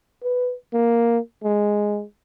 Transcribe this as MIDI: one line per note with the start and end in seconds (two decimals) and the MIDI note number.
0.23 0.54 71
0.73 1.19 58
1.44 2.03 56